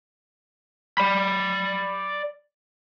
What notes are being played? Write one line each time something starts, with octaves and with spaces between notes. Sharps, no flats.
D5 B5